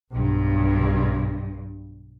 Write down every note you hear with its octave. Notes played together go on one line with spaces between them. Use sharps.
B1 G2